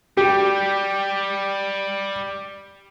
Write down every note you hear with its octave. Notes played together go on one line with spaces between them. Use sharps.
G3 G4